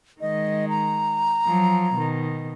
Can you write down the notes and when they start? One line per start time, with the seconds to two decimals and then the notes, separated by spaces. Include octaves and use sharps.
0.21 D#3 G#3 D#5
0.69 A#5
1.46 F3 F#3
1.94 B2 D#3